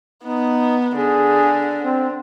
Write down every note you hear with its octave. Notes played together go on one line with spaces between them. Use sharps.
B3 D#4
D3 G#4
C4